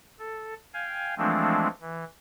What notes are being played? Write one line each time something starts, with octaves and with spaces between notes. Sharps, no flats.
A4
F5 G5 G#5
E3 F3 G#3 A3 C4 D4
E3